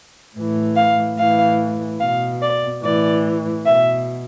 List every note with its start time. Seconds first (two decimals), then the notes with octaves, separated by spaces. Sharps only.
0.36 A2 E3
0.76 F5
1.17 A2 E3 F5
1.99 B2 F5
2.42 D5
2.82 A2 E3 D5
3.65 B2 E5